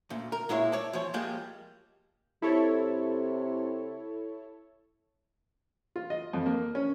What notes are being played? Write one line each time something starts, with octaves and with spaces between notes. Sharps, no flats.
D2 A#2
A#4
A#2 G#3 E4 C#5
C#5 D5 A5
E2 F3 C#5
F3 G3 G#3 A#3 G5
C3 E4 A4 C#5
F4
D#5
F2
A#3
C#4